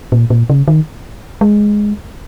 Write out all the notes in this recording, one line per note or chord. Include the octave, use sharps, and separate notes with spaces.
A#2
A#2
C#3
D#3
G#3